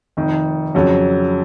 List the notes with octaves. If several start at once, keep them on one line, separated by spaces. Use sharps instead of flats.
F1 F2 D#3
F2 C#3 F#3